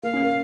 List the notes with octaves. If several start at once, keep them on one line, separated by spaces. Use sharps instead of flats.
A#3 F5
C#4
A#3